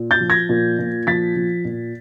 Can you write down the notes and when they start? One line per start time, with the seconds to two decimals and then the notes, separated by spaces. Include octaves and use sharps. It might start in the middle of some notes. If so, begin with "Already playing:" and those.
Already playing: A#2
0.11 G6 A6
0.21 F3
0.30 G#6 A#6
0.49 A#2
0.79 A#2
1.07 F3 A6 B6
1.36 F3
1.65 A#2